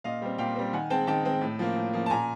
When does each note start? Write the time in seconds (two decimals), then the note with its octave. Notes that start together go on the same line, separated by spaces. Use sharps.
0.04 A#2 D#5 F5
0.22 G3 C4
0.38 A#2 F5 G5
0.56 G3 C4
0.73 D#3 F#5 G#5
0.90 G#3 C4 G5 A5
1.07 D#3 G5 A5
1.25 G#3 C4
1.41 A2
1.59 F3 A#3
1.76 A2
1.93 F3 A#3
2.06 A5
2.10 A#2 G#5 A#5